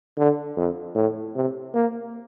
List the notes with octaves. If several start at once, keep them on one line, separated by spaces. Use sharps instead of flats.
D3
F2
A2
C3
A#3